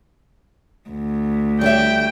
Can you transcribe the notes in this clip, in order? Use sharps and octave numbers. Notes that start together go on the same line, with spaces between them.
D2
G3 C#5 E5 G5